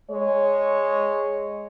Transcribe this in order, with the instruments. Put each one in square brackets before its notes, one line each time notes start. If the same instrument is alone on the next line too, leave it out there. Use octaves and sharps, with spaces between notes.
[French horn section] G#3 C#5